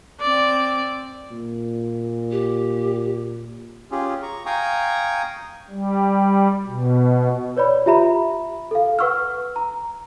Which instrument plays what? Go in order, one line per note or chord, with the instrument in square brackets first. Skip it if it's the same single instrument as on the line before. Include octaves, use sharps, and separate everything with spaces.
[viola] C4 D5
[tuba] A#2
[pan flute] G4
[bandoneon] C#4 F4 G4 G#4
A#5 C#6
F5 G5 G#5 A#5 C#6 D#6
[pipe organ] G3
B2
[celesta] B4 C#5 D5 B5
F4 G4 E5 A#5 B5
A4 F5
B4 F#5 C#6 E6 F6
A#5